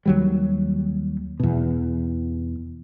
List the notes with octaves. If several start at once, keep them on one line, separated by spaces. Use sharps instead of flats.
D#2 F#3 G3
E2 B2